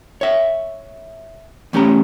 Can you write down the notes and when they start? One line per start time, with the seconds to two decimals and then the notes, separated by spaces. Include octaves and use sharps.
0.21 C#5 E5
1.73 E2 A3 C#4 G4 A#5